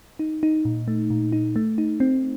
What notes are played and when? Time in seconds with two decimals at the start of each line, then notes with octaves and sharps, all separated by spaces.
0.19 D#4
0.43 D#4
0.65 A#2
0.88 A3
1.10 A#2
1.32 D#4
1.56 A3
1.78 D#4
2.00 C4